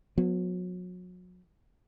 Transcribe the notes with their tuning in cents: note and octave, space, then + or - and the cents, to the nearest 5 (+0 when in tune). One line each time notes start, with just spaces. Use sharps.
F#3 -35 B3 +0